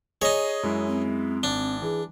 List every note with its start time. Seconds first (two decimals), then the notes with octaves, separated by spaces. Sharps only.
0.22 D#4 G#4 C#5 D#5
0.63 F#2 G#3 E4
0.88 C4
1.43 G#1 D4
1.82 E3 G#4